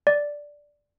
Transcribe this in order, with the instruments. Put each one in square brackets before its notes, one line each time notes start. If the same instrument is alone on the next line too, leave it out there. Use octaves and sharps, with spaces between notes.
[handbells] D5